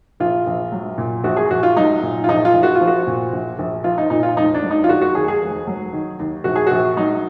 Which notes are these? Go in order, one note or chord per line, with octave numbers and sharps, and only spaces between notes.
A#1 F4
A#1
F#3
A#2
A#1 F#4
G#4
A#1 F#4
F4
F#3 D#4
A#2
F4
A#1 D#4
F4
A#1
F#4
F4
F3
F#4
A#2
A#1
A#1
F3 F4
D#4
A#2 D#4
F4
F1 D#4
D4
F#3
D#4
F4
D#3 F#4
F#4
D#2 G#4
G#4
F1
F#3
D#3
D#2
A#1 F#4
G#4
A#1 F#4
F#3 D#4